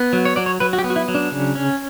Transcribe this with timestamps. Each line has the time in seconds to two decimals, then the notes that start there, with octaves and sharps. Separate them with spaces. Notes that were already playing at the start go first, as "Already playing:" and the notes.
Already playing: B3
0.13 F#3
0.25 C#5
0.36 F#3 D5
0.46 C#5
0.60 F#3 B4
0.73 F#4
0.78 G4
0.84 B3
0.90 F#4
0.96 E4
1.08 F#3
1.15 D4
1.31 C#3
1.55 C#4